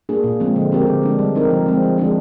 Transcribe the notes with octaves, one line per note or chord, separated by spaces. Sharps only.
A#3 D4 G#4
A#2
F3 G#3 C4
D3
G#3 C4 G4 A#4
D3
G#3 D4
G3
C4 D#4 A#4
F3
G#3 C4
F3
G#3 D4 G#4